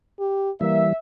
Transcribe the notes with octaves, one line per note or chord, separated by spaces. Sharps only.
G4
E3 G3 A#3 E5